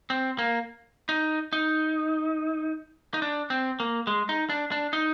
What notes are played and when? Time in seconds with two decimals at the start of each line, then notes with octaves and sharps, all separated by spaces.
0.10 C4
0.39 A#3
1.09 D#4
1.53 D#4
3.14 D#4
3.22 D4
3.50 C4
3.80 A#3
4.07 G#3
4.29 D#4
4.49 D4
4.72 D4
4.93 D#4